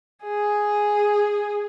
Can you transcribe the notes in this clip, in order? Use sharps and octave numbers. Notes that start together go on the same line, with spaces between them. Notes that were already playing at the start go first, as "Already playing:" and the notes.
G#4